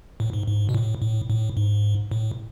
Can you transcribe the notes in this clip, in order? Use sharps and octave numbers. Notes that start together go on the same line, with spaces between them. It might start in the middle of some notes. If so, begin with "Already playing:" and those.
A2
G#2
G#2
B2
A2
A2
A2
G#2
A2